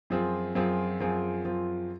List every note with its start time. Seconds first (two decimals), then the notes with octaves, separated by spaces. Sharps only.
0.10 F#2 F3 C4 F4 G#4
0.55 F#2 F3 C4 F4 G#4
1.00 F#2 F3 C4 F4 G#4
1.44 F#2 F3 C4 F4 G#4